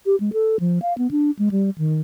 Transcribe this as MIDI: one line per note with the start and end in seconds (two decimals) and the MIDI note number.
0.06 0.16 67
0.20 0.30 56
0.33 0.60 69
0.60 0.79 53
0.82 0.94 77
0.98 1.11 59
1.11 1.31 62
1.39 1.49 56
1.51 1.70 55
1.78 2.01 51